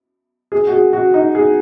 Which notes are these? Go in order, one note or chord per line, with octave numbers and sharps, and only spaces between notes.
G#4
F#4
G#4
F#4
D#4
G#4